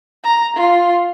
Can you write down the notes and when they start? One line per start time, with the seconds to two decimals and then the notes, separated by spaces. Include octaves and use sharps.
0.24 A#5
0.57 F4